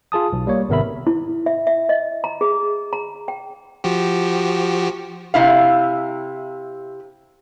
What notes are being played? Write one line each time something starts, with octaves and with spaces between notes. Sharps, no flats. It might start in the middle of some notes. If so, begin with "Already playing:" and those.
F4 G#4 A5 D#6
B1
G3 A#3 C#5
G#1 C3 B3 A#4 E5 B5
E4
E5
E5
D#5
A#5
G#4
A#5
G5
F3 F#4 G4
C3 E4 F5